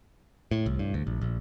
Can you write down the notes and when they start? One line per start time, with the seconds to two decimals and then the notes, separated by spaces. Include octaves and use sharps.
0.51 A2
0.66 C2
0.79 G2
0.94 D2
1.07 A#1
1.21 A#1